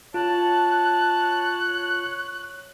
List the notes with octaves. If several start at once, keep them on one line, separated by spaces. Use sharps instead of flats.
F4 C#5 A5 F#6